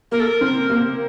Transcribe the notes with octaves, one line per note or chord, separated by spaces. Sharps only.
A#3 A#4
A4
A#4
C4
A#3